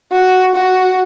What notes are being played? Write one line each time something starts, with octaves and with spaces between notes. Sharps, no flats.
F#4
F#4